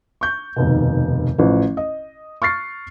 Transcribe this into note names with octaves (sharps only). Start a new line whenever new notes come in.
C#6 G6
F1 D#2 B2
A1 F3
D#5
C#6 F6 A6 C7